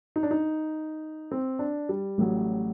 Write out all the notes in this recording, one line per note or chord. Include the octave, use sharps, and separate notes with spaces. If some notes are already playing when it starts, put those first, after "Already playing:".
D#4
D4
D#4
C4
D4
G3
A1 A2 F#3